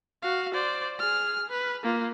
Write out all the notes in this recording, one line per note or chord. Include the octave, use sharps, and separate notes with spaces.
F#4 F5
C5 D5
G#4 F6
B4
A#3 F4